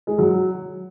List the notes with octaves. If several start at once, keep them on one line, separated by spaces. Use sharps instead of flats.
G#3
F#3